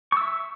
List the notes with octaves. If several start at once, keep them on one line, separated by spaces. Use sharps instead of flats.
E5 C#6 E6